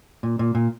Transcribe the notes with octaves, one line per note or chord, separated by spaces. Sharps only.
A#2
A#2
A#2